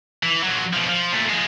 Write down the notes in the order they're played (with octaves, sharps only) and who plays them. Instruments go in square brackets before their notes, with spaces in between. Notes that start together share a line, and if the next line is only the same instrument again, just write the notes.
[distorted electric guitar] E3
A#2 F#3
B2 F3
F3
A#2 A3
F3 G#3